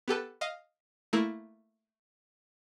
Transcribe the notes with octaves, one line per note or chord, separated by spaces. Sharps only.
B3 G4 A4 B4
D#5 F5
A3 A#3 E4